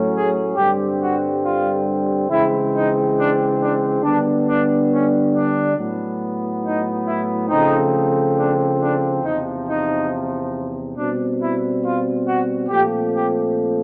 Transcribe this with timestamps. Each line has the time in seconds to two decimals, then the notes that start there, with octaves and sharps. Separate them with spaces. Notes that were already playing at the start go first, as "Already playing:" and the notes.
Already playing: A2 F#3 A3 C#4
0.13 G#4
0.56 G2 D3 G3 C4 G4
1.00 F#4
1.42 F4
2.30 C#3 E3 G#3 C4 E4
2.72 D#4
3.16 D4
3.59 D4
4.02 D3 G3 B3 D4
4.46 D4
4.89 C#4
5.32 D4
5.76 A2 F#3 B3
6.62 D#4
7.05 E4
7.49 C#3 F3 A3 C4 D#4
8.35 D4
8.79 D4
9.22 E2 C3 F3 D#4
9.66 D#4
10.95 B2 G3 C4 D4
11.39 E4
11.82 F4
12.25 F#4
12.69 A#2 F3 A3 C4 G4
13.12 G4